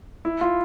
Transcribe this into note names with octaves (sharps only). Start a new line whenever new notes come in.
E4
F4